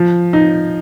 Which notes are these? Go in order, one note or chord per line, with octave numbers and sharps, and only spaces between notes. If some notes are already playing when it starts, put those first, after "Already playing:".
Already playing: F3
D#4